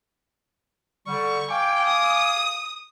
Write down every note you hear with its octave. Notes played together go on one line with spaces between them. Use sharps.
D3 G3 C#6
F5 G5 G#5 D6
D#6